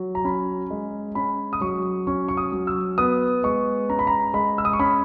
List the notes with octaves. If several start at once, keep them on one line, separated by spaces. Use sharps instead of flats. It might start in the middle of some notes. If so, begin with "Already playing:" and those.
Already playing: F#3
A#5
C#4 B5
G#3
C#4 B5
D#6
F#3 C#6
C#4 C#6
C#6
D#6
F#3
E6
B3 D#6
G#3 C#6
C#4 A#5
B5
A#5
G#3 B5
E6
D#6
C#6
C#4 B5